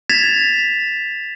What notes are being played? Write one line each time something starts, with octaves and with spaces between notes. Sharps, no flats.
G#6 A6 B6 E7 F7